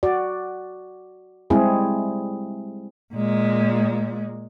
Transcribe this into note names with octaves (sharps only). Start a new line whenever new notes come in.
F#4 D5
G3 G#3 C4 E4 G#4
A#2 G#3